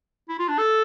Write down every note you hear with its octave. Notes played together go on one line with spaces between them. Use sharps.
E4
F4
D4
A4